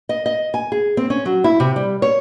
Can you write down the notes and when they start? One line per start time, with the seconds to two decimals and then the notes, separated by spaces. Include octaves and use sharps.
0.09 D#5
0.26 D#5
0.54 G#5
0.72 G#4
0.97 C4
1.10 C#4
1.25 F#3
1.44 E4
1.60 C3
1.76 G3
2.02 C#5